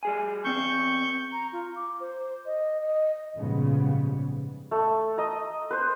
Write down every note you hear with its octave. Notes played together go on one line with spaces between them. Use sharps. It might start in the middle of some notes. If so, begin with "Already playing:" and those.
G3 G#4 G#5
E2 C4 C#6 G6
A#5
F4
D6
C5
D#5
D#5
A#1 G#2 C#3 F3 G3 B3
A3
D#5 A#5
B4 C5